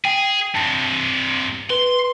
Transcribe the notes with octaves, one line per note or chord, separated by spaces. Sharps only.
G#4 G5
G2 C3 A5 A#6
B4 C6